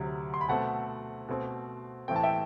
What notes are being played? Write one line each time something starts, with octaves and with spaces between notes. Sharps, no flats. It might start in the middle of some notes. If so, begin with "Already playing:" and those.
Already playing: D2 C3 F#3
C6
B5
B2 A3 C4 F#5 A5
B2 A3 C4
A2 E3 A3 C4 G5
A5
E5 G5